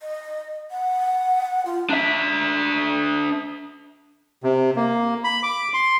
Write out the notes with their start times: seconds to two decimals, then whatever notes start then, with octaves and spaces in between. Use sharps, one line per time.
0.01 D#5
0.71 F#5
1.66 F4
1.89 D4 E5
4.44 C3
4.76 A#3
5.24 B5
5.43 D6
5.74 C6